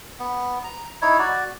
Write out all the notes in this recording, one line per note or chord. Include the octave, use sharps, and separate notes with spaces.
B3
A#5
D#4 E4 C#5
F#4 D5